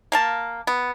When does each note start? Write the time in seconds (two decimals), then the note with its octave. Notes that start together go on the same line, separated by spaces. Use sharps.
0.12 A#3 F5 A5
0.67 B3